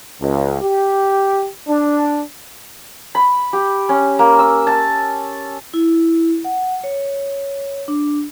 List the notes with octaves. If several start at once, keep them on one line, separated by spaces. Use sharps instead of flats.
C#2
G4
D4
B5
G4
C#4
A#3
E6
A5
E4
F#5
C#5
D4